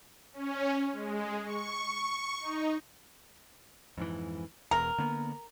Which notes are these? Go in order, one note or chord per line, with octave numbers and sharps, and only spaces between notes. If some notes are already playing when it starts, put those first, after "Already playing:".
C#4
G#3
C#6
D#4
F2 G#2 E3
E1 E2 A#4
D3 A#3 B3